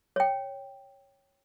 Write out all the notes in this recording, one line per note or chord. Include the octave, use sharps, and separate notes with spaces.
C#5 G5